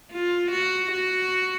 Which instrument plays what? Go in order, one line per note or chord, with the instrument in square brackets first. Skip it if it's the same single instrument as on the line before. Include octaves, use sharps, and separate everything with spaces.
[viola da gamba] F4
F#4
F#4